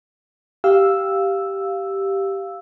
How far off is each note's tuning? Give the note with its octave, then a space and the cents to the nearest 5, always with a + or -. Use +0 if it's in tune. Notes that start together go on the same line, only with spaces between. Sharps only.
G4 -5 F5 +0 E6 +0